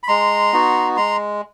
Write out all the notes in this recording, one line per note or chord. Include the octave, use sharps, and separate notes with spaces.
B5
G#3 A#5 C6
B3 D#4 F#4
G#3 A#5 C6